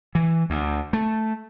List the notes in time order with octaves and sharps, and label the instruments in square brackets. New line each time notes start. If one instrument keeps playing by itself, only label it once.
[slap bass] E3
D2
A3